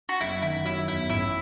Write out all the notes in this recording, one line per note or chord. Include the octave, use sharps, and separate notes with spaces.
F#4
F#1 E4
D#3 E4
F#3 E4
E2 E4
A1 E4